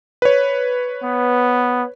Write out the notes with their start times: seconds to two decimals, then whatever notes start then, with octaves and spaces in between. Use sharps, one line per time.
0.22 B4 C#5
1.03 B3